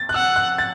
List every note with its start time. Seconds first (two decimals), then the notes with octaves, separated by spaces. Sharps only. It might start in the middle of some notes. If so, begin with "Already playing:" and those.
Already playing: A6
0.09 F#6
0.14 F#5 E6
0.36 F#6
0.58 A6